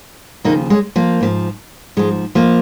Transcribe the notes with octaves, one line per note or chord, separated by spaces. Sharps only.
D#2 C#3 F3 A#3 D#4
G#3 C#4
F3 A#3
G#2 F3
G#2 F3 G#3
F3 A#3